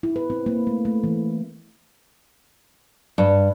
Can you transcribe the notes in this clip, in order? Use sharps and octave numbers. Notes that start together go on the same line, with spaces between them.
E4
B4
C4
A#3
A3
A3
E3
G2